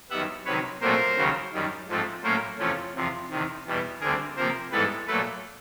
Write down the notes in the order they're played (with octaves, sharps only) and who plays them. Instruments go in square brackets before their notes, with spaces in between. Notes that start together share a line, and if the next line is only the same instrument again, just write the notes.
[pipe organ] F#2 D#3 G3 B3 E5 F#5
C3 D#3 F#3 B4 C#5
A#2 F#3 A3 C4 A#4 C5
D#2 C#3 F#3
F#2 D#3 G3
G#2 F3 A3 C4
A2 F#3 A#3 C#4 A#4 C5
E2 C3 F3 A3 C#4
E2 C3 F3
E2 C3 D#3
E2 B2 G3 B3
D2 D3 G3 C4 G#4 A#4
C3 F3 A#3 A#4 C5
G#2 E3 G3 B3 A4 B4
A#2 F#3 A3 A4 B4